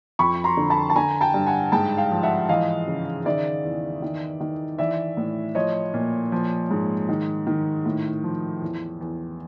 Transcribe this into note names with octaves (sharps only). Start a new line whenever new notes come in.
F2 B5 C#6
A#5 C6
D3
A5 B5
A5
D3 G#5 A#5
G5 A5
G2
F#5 G#5
G#2 G5 A5
F5 G5
F3
E5 F#5
E3 D#5 F5
C#3
D#3 D5 E5
E2
D#3
D#3
E3 D5 E5
A2
F3 C#5 D#5
A#2
F3
G#2
D#3
D#3
A2
F3
E2
E2